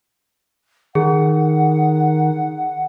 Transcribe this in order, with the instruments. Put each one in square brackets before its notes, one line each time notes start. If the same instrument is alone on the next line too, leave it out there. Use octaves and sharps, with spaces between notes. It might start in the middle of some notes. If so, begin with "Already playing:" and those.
[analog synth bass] D#3 [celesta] G#4 [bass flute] F#5